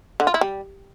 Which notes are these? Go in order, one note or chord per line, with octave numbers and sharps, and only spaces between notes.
D3
F4
E4
G3